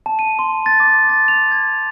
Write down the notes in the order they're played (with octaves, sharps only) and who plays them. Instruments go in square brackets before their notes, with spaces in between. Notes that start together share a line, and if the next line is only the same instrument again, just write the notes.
[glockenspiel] A5
D#7
C6
A6
D6
A6
F7
G#6